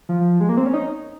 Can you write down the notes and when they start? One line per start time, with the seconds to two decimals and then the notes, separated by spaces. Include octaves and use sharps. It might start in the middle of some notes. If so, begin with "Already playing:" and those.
0.09 F3
0.40 G#3
0.49 A#3
0.57 C4
0.66 C#4
0.74 D#4